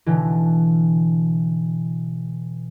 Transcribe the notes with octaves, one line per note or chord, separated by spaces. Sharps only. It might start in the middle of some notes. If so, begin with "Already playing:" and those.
B2 D3 E3